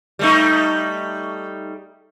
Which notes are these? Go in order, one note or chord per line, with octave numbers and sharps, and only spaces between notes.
G3 A3 D#4